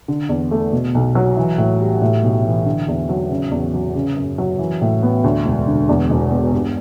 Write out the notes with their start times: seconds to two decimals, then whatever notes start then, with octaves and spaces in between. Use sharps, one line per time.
0.08 D3
0.29 E2
0.51 A3
0.72 B2
0.95 B1
1.15 F#3
1.37 E3
1.58 A2
1.80 G3
2.02 A2
2.23 B1
2.45 E3
2.66 D3
2.88 E2
3.09 F#3
3.30 C#3
3.51 E2
3.74 F#3
3.95 C#3
4.17 F#2
4.38 F#3
4.59 E3
4.81 A2
5.03 B3
5.24 D2
5.46 E1
5.67 D3
5.89 E2
6.10 E1
6.31 B2
6.53 G2